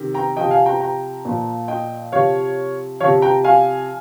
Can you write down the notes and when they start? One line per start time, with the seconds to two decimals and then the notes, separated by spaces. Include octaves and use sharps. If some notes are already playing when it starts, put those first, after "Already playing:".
Already playing: C3 D#3
0.14 G5 A#5
0.36 C3 F3 D#5 G5
0.51 F5 G#5
0.66 G5 A#5
0.80 G5 A#5
1.25 A#2 F3
1.68 D#5 G5
2.12 C3 F3 C#5 F5
3.00 F3 C#5 F5
3.04 C3
3.22 G5 A#5
3.44 F5 G#5